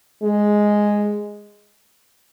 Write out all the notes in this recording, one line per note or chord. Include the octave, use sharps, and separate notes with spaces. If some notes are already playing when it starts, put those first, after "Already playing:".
G#3